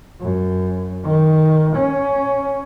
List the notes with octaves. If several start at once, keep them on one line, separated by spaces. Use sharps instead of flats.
F#2
D#3
C#4